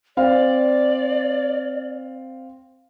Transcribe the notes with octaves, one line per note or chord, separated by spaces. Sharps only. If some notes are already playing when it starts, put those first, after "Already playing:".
C4 D5 F5